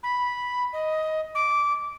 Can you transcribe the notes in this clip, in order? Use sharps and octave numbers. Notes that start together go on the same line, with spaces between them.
B5
D#5
D6